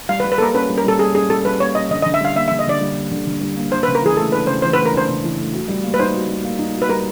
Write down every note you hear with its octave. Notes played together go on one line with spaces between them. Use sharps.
G3 F5
B4
G3
B4
A#3 A4 A#4
C#4 B4
G3
A#4
G3 A4
A#3 G#4
C#4 G#4
G3 A4
G3 B4
A#3 C#5
C#4 D#5
D3 D#5
D3 D#5
E5
G3 F5
A#3 E5
D3 E5
D#5
D3 D5
G3
A#3
D3
D3
G3
A#3
D4 C5
C#3 B4
A#4
E3 G#4
A3 A4
D4 B4
C#3 C5
E3 C5
A3 B4
A#4
D4 C5
C#3
E3
A3
F#4
G3
A#3
B4
D#4 C5
F#4
G3
A#3
D#4
F#4
B4
G3 A#4